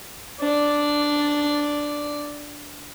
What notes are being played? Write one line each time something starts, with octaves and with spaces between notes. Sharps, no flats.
D4 D5